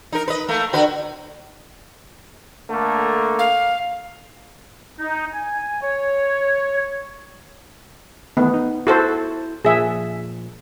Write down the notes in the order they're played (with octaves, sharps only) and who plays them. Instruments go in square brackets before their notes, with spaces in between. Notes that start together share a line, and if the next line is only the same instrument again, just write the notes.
[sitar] D#4 A#4
B4 D#5
A3 A#3
D3 F#4 B4
[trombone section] D3 A3 A#3
[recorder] F5
[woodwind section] D#4
G#5
C#5
[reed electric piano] D#3 E3 A3 [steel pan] B3
[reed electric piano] D#4
[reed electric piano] E4 [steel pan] F#4 A4 C5
[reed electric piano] A#2 F3 [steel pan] G#4 E5